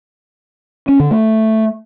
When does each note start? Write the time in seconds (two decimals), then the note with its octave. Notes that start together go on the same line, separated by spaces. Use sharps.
0.88 C#4
1.00 D3
1.11 A3